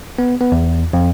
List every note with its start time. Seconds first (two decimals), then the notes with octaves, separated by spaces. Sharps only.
0.19 B3
0.41 B3
0.52 E2
0.93 F2